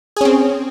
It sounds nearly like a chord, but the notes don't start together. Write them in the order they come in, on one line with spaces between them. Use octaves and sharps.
G#4 C#4 C4